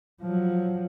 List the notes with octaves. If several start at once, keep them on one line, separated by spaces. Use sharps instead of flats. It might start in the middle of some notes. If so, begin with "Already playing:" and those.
F3 F#3